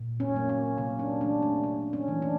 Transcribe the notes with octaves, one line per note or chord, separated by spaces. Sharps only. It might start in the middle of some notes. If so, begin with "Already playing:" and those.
Already playing: A#2
C#4
F#3 A#3
C#4
C3 C#4
D4
E3 A3 D4
C#4
C3 C#4
C#4
E3 A3
D4